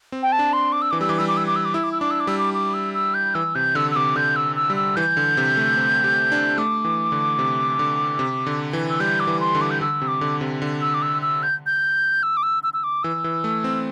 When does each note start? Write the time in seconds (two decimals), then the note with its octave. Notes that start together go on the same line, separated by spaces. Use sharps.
0.12 C4
0.23 G5
0.32 A5
0.39 D4
0.53 C6
0.73 D6
0.82 E6
0.91 E3 D6
1.01 G3 E6
1.09 E3 D6
1.18 G3 E6
1.28 D6
1.37 E6
1.47 D6
1.56 E6
1.65 D6
1.74 E4 E6
1.84 D6
1.92 E6
2.01 D4 D6
2.11 E6
2.20 D6
2.27 G3 E6
2.39 D6
2.54 D6
2.74 E6
2.94 E6
3.14 G6
3.35 E3 E6
3.55 C3 G6
3.75 D3 E6
3.91 E6
3.96 C3 D6
4.16 D3 G6
4.36 E6
4.56 E6
4.70 G3
4.76 E6
4.96 E3 G6
5.17 D3
5.37 C3
5.57 A3
5.77 C4
6.04 G4
6.32 D4
6.58 A3 D6
6.85 E3
7.12 D3
7.39 C3
7.79 D3
8.19 C3
8.46 D3
8.73 E3
8.90 E6
9.00 G3 G6
9.20 D6
9.27 E3
9.40 C6
9.55 D3
9.61 D6
9.71 G6
9.81 D3 E6
10.02 C3
10.08 D6
10.21 D3
10.41 C3
10.62 D3
10.82 E6
10.94 D6
11.02 E6
11.22 E6
11.43 G6
11.66 G6
12.23 E6
12.37 D6
12.43 E6
12.63 E6
12.74 E6
12.84 D6
13.03 E3 E6
13.24 E3
13.44 A3
13.64 C4